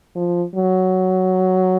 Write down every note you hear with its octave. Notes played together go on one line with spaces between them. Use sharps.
F3
F#3